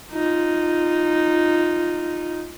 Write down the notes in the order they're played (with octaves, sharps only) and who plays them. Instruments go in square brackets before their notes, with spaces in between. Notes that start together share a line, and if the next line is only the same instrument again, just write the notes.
[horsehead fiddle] D#4 F4